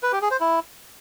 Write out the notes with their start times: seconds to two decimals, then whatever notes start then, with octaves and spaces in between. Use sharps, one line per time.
0.03 B4
0.12 G4
0.22 G#4
0.31 C5
0.41 E4